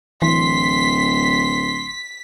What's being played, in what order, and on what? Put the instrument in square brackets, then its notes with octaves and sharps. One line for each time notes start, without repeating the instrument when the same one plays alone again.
[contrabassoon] D1 [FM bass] E3 [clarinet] C6 [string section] B6